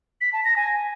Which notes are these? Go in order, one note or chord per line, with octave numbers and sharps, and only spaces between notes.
B6
A5
A#6
G#5